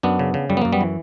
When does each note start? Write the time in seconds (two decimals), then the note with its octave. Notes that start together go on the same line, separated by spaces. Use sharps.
0.03 F#2 B3 D4
0.19 C#3
0.34 C#3
0.49 F#2 G3
0.57 B3
0.62 F#2 A#3
0.72 G3 B3
0.81 E3